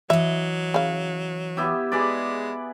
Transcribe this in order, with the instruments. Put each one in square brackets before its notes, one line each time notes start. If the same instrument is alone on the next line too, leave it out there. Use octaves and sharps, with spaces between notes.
[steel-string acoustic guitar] E3 D#5 [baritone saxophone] F#3 [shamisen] E5
[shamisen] C#3 F5
[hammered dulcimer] B3 E4 G4
[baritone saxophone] G#3 [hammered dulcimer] G#4 B4 D5